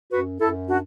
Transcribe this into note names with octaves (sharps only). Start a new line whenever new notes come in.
F#2 F#4 B4
F#2 E4 A4
D4 F#4